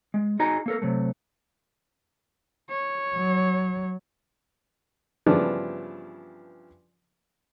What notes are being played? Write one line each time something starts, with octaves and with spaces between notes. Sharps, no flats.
G#3
D#4 F#4 G#4 D#5 G#5 A#5
A#3 A4 A#4
C3 F#3 A3
C#5
F#3
G2 C#3 E3 F3 B3 D4